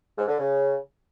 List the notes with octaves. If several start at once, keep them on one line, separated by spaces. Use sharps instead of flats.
G#2
D3
C#3